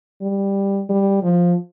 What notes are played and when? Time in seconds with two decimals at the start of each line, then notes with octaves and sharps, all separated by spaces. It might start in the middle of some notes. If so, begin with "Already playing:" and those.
0.22 G3
0.89 G3
1.23 F3